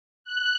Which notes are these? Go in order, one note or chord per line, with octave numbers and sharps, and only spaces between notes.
F#6